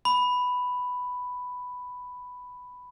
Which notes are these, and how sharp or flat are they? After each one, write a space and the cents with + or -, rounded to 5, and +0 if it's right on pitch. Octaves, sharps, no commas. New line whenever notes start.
B5 +5